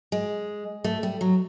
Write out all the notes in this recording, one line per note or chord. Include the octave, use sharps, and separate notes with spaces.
G#3
A3
G3
F#3